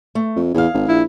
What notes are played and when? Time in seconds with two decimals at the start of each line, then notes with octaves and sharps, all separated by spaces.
0.15 A3
0.36 F2
0.54 E2 G#4 F5
0.74 G#1
0.88 A#1 E4